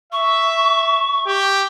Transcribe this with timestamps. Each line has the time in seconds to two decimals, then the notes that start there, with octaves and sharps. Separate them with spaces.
0.12 E5 C#6
1.27 G4